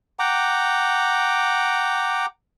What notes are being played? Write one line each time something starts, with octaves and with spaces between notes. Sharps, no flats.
F#5 G5 A#5 D6